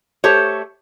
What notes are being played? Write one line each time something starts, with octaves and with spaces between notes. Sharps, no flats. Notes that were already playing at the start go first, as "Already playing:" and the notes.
A3 G4 A4 C5 C#5